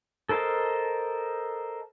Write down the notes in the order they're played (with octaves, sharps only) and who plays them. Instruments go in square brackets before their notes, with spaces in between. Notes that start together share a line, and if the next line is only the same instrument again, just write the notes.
[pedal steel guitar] A4 A#4 C5 D#5 A5